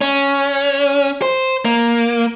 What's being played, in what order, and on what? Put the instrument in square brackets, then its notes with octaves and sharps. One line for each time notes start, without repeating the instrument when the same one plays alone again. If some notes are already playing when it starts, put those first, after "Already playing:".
[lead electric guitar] C#4
C5
A#3